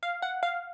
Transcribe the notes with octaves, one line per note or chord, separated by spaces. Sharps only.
F5
F#5
F5